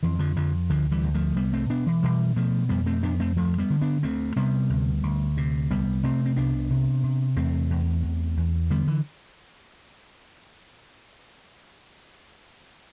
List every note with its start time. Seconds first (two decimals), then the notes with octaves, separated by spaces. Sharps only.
0.03 F2 E3
0.19 D3 F3
0.36 F2 D3 F3
0.69 D2 D3 F3
0.91 E3 G3
1.03 D2
1.14 F3 A3
1.36 C2 G3 B3
1.53 A3 C4
1.70 B2 B3 D4
1.86 E3
2.03 B2 E3 G3
2.36 B2 F3 A3
2.69 F2 G3 B3
2.86 A3 C4
3.03 F2 B3 D4
3.20 A3 C4
3.36 D2 F3 A3
3.58 G3 B3
3.70 D3
3.82 B3 D4
4.03 D2 A3 C4
4.36 C3 G3 B3
4.70 D2
5.03 D2
5.37 C3
5.70 C2 G3 B3
6.03 C3 A3 C4
6.26 C4
6.36 C2 B3 D4
6.70 C3
7.03 C3
7.37 E2 A3 C4
7.70 E2
8.03 E2
8.37 E2
8.70 D3 G3 B3
8.87 E3